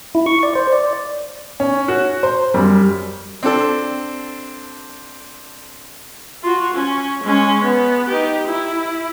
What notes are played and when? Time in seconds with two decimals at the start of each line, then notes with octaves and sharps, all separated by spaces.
0.15 E4
0.26 C#6
0.43 D5
0.55 C5
0.73 D5
1.60 C#4
1.88 F#4
2.23 C5
2.54 F#2 G3
3.43 C4 D4 A4
6.42 F4 F#4
6.74 C#4
7.23 G#3 C#4
7.63 B3
8.08 D#4 G4
8.46 E4